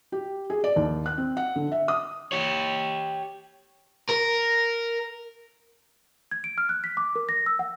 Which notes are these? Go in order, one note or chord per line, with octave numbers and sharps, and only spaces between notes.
G4
G#4
D5
D#2
F#6
C4
F#5
D3
E5
D#6
G4 C#5
A#4
G#6
D7
F6
F#6
B6
D6
A#4
A#6
E6
F#5